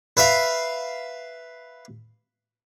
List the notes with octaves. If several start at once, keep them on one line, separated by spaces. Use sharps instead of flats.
B4 E5 F5